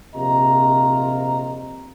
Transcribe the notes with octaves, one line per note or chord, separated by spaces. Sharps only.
A#1 C3 F4 D#5 A#5